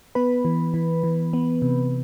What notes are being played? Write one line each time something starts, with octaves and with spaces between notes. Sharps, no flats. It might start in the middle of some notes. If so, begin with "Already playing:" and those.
B3 B4 B5
E3
E3
E3
B3
C3